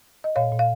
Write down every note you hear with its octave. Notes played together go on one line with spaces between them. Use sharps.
D#5
A#2 C#5 F5
A#2
F5